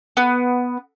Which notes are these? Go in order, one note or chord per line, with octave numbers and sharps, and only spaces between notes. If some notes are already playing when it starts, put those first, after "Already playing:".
B3